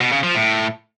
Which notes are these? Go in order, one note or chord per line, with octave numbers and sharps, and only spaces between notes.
B2
C#3
F3
A2